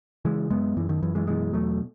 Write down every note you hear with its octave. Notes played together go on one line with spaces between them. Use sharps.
C#3 E3 G#3
F#2 G#3 B3
F#2 E3
D#3
F#2 E3
E3 G#3
B2 E3 G#3
E2 F#3 A3